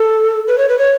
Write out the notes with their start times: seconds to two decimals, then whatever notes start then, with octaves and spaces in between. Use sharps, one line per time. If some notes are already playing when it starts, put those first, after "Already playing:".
Already playing: A4
0.47 B4
0.58 C#5
0.69 B4
0.79 C#5